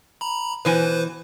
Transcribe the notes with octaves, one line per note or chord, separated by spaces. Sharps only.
A#5 B5
B2 E3 B4 C5 G#5